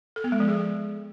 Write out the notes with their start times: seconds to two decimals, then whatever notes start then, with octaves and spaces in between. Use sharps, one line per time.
0.16 A4
0.24 B3
0.32 G#3
0.40 F3
0.48 G#4